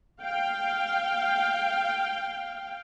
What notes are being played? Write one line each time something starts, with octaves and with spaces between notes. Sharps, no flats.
F5 G5